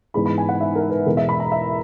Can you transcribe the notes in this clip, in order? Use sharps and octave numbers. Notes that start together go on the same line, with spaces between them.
G#2 E3 G#3 B3 D#4 B5
B5
G#5
F#5
E5
A#4
B4
E2 B2 G#3 A#4
E5
B5
A#5
E5